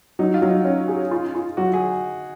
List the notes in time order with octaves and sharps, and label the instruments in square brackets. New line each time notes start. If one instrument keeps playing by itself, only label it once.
[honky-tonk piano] F#3 [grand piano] D#4
[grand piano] F4
[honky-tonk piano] F#3
[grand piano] D#4
[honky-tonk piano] C#4
G#4
F4
F4
[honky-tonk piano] F#3 [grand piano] F#4
[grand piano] G#4